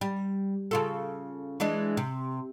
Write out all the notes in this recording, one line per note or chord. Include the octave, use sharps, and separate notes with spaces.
G3
C#3 F4 A4
E3 G#3 D4
C3